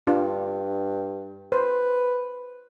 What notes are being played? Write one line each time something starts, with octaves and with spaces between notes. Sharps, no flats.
G2 D4 F4
B4 C5